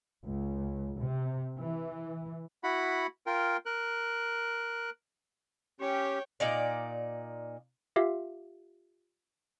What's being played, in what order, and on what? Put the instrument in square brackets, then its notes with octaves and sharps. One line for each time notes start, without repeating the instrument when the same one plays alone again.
[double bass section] C#2
C3
E3
[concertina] E4 F#4 F#5 B5
F4 A#4 G5
A#4 F#6
[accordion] C#4 G4 [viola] C#5 G5
[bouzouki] A#2 D#4 D5
[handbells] F4 G4 E5 F5